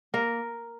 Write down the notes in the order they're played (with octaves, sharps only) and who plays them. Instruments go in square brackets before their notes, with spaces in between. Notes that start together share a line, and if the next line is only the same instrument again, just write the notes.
[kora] A#3 A#4